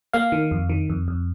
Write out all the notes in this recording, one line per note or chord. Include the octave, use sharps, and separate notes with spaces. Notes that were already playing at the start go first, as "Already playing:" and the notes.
A#3 F5
D#3
F2
D#3
F2
F2